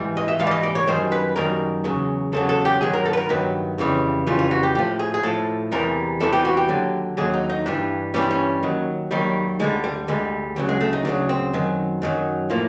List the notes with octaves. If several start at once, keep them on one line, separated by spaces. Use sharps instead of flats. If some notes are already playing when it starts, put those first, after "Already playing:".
Already playing: G#2 E3 G3
D#5
E5
G#2 E3 G3 F5
D5
D#5
D5
C#5
F#2 D#3 G3 C5
B4
F#2 D#3 G3 A#4
E2 C#3 F#3
E2 C#3 F#3 A4
A4
G4
G2 D#3 F#3 G#4
A#4
A4
B4
A#4
G2 D#3 F#3 B4
F2 C#3 E3 G3
F2 C#3 E3 G3 F4
F4
F#4
G4
A2 F3 G4
G#4
G#4
A2 F3 A4
E2 C3 E3 G3 A#4
E2 C3 E3 G3 A4
G4
F#4
G4
D#2 D3 F#3
D#2 D3 F#3 G#4
D#4
D#4
G2 E3 G3 D4
G2 E3 G3 C#4
C4
C#4
D#2 D#3 F#3
D#2 D#3 F#3 G3
D2 D3 G3 G#3
G3
D2 D3 G3 G#3
D2 C#3 F#3 G3
G#3
A3
D#4
D2 C#3 F#3 D4
C4
F#2 D#3 F#3
F#2 D#3 F#3
A2 F3 A#3